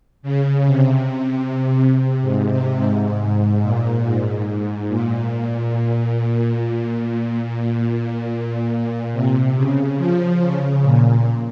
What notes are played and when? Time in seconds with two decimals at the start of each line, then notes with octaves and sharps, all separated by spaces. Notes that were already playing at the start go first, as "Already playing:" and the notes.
0.23 C#3
0.66 C3
1.93 C3
2.21 G#2
2.49 C3
2.77 G#2
3.19 G#2
3.62 A#2
4.04 G#2
4.46 G#2
4.89 A#2
7.01 A#2
7.44 A#2
8.71 A#2
9.12 C3
9.56 C#3
9.98 F3
10.40 C#3
10.83 A#2